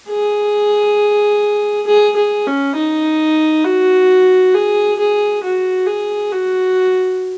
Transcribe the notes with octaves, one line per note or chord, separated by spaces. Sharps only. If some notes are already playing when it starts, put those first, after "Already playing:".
G#4
G#4
G#4
C#4
D#4
F#4
G#4
G#4
F#4
G#4
F#4